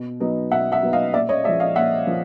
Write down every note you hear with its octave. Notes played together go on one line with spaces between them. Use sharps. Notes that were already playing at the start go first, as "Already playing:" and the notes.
Already playing: B2
F#3 B3 D#4
B2 E5 F#5
E5 F#5
F#3 B3 D#4
D#5 F5
A#2 D5 E5
C#5 D#5
F3 G#3 D5 E5
D#5 F5
A#2 E5 F#5
F3